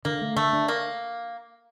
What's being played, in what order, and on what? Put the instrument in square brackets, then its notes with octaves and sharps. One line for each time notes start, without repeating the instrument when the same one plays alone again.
[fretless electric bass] D3 [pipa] A#3
[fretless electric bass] A3
[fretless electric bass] D3 [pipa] A3
[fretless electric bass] D4
[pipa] A#3